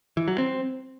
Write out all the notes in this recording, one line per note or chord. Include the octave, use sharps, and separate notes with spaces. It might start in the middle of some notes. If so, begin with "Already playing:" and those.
E3
F#3
C4